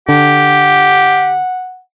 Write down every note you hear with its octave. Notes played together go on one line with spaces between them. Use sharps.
D3 G4 F#5